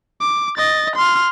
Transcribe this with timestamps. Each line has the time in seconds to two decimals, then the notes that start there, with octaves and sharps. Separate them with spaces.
0.21 D6
0.58 D#5 A6
0.96 C6 F6